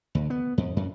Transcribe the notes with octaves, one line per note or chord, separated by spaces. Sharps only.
D2
B3
F2
F#2